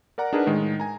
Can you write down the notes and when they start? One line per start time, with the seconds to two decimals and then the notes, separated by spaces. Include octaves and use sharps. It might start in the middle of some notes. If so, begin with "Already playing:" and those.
0.18 A#4 D5 F#5 A#5
0.33 D4 D#4 G#4 A#4 B4 F#5
0.46 A2 D#3 G#3
0.80 G#5 A#5